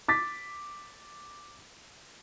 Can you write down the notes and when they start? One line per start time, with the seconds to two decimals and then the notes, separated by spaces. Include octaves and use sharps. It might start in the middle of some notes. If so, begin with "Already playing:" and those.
0.08 D6 A6 B6